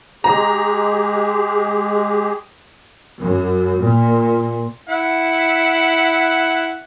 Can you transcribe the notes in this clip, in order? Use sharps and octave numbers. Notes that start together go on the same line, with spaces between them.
G#3 G4 G#4 A#5
F#2
A#2
E4 F#5